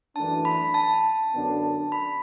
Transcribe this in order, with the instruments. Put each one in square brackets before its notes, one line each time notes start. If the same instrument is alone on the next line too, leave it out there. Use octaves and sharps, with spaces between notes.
[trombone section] F#2 E3 A3 D4 [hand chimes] A5
[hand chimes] B5
A5
[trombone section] F#2 D3 B3 D4
[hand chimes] B5